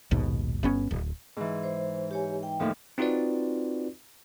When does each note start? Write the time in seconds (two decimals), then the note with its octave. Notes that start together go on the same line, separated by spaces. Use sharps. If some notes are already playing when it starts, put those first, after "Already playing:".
0.11 A#1 D#2 G#2 B2
0.63 G1 B3 C#4
0.91 D1
1.37 G#2 E3
1.63 C5
2.11 G4 C#5 G#5
2.43 G5
2.60 D#2 A2 F3
2.98 C4 D#4 F4 F#4 B4 D5